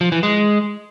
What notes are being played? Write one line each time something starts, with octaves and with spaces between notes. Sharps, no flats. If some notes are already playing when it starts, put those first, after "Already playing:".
F3
E3
G#3